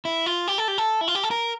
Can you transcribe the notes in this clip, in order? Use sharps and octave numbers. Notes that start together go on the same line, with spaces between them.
E4
F4
G4
A4
G4
A4
E4
F4
G4
A4
A#4